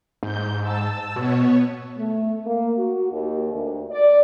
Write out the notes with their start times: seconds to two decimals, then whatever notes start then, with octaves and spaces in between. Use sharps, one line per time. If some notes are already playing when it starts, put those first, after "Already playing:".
0.23 G#2 G6
0.62 A5 E6
1.16 B2 B3 C#5
1.97 A3
2.46 A#3
2.78 F#4
3.12 D#2
3.51 D2
3.90 D5